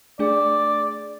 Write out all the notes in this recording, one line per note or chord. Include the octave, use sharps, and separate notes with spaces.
A3 D4 G#4 D5